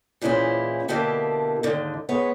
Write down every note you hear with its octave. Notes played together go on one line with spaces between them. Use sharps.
A#2 E3 G#3 C#4 E4 C5
B2 D3 A#3 E4 G4 A4
D#2 G#2 D3 D#3
G#3 B3 C#5